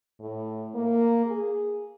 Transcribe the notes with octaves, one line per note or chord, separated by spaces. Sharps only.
A2
A#3
G#4